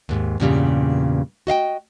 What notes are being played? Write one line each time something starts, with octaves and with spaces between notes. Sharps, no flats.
D#2 G#2
E2 G2 A#2 C#3 G3
F#4 D#5 F5 G5